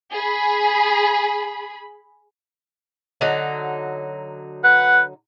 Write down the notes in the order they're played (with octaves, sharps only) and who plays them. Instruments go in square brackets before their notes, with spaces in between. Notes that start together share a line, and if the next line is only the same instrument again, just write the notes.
[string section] G#4 B5
[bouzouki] D3 F#3 D#4
[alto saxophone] B4 [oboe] F#5